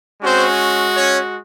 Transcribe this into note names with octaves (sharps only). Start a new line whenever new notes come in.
G#3 C4 C#4 F#4 C5
C#4 C#5